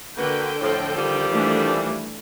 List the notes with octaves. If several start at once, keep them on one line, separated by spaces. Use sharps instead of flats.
D3 A#3 F#4 B4 G5
A2 F3
D#3 F3 G3
E3 A3 D4